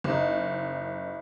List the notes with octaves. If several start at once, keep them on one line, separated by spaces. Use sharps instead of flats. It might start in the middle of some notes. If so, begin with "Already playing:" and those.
F#1 D#4